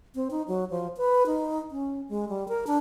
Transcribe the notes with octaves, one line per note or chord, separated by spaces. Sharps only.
C4
D#4
F#3
F3
B4
D#4
C#4
G#3
G3
A#4
D4